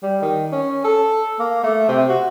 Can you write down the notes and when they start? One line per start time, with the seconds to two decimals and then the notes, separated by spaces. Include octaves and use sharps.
0.03 G3
0.22 D#3
0.52 C#4
0.84 A4
1.39 A#3
1.63 A3
1.88 C3
2.09 F#4